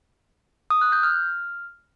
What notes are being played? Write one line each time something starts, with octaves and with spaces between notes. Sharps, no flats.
D#6
F#6
G6
F6